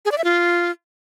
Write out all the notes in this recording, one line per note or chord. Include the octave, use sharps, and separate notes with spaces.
G#4
D5
E5
F4